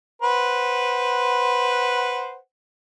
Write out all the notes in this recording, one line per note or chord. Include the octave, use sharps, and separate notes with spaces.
B4 C5 F#5